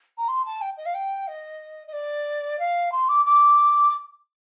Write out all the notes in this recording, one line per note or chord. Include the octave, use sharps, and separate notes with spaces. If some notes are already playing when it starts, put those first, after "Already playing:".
A#5
C6
A5
G5
D#5
F5
G5
D#5
D#5
D5
F5
C6
D6
D6